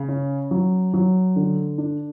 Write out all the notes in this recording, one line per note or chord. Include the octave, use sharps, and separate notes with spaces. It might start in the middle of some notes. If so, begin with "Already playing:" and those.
Already playing: C#3
C#4
F#3
F#3
D3
D4